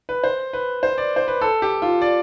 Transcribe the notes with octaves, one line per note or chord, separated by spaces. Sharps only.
B4
C5
B4
C5
D5
C5
B4
A4
G4
F4
D5